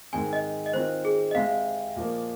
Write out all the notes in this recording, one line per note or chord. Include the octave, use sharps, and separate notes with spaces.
G#2 D#3 C4 G#4 G#5
D#5
D#5
D#3 C4 F4 C5
G#4
D#5
C3 G#3 C4 F5
A#2 F3 A#3